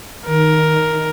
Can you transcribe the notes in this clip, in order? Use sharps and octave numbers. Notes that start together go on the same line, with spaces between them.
D#3 A#4